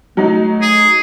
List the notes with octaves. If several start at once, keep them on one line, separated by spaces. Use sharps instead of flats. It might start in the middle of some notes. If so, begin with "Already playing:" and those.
F#3 A3 D#4
G#4